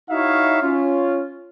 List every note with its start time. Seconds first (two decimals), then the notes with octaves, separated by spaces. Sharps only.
0.10 D#4 E4 F#4 C#5 E5 F5
0.62 C#4 F4